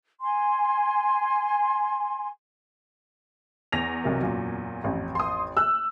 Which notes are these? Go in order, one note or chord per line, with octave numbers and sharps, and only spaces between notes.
G#5 C6
E2 A#6 F7
B1 C3 A#4
F#2 A#2
A1 F2
C6 D#6
E6 F#6